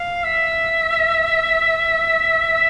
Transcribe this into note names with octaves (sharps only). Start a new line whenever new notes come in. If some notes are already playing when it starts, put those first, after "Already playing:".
Already playing: F5
E5
E5